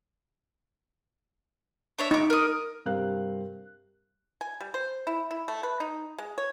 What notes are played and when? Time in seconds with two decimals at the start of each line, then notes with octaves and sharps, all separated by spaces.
1.99 D4 C#5 E5
2.11 D#4 C#6 D6
2.30 A#4 D#6
2.86 G2 C3 C4 A#4 F5 F#6
4.41 G#5
4.61 G3
4.74 C5
5.07 E4
5.31 E4
5.48 A3
5.63 B4
5.80 D#4
6.18 G#3
6.38 C#5